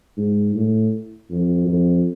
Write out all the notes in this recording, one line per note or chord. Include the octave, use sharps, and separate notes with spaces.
G#2
A2
F2
F2